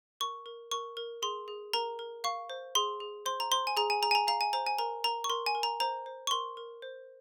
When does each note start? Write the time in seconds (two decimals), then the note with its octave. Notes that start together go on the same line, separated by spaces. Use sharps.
0.20 A#4 C#6
0.46 A#4
0.71 A#4 C#6
0.97 A#4
1.22 G#4 C6
1.48 G#4
1.73 A#4 A#5
1.99 A#4
2.24 F5 C#6
2.50 C5
2.75 G#4 C6
3.00 G#4
3.26 C5 C6
3.40 A#5
3.51 C5 C6
3.67 G#5
3.77 G#4 A#5
3.90 G#5
4.02 G#4 A#5
4.11 G#5
4.15 A#5
4.27 F5 A#5
4.41 G#5
4.53 C5 A#5
4.67 G#5
4.79 A#4 A#5
5.04 A#4 A#5
5.24 C#6
5.29 A#4 C6
5.46 G#5
5.55 A#4
5.63 A#5
5.80 C5 A#5
6.06 C5
6.27 C#6
6.31 A#4 C6
6.57 A#4
6.82 C5